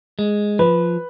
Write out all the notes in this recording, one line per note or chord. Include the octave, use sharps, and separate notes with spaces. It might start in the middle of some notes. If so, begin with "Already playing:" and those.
G#3
F3 B4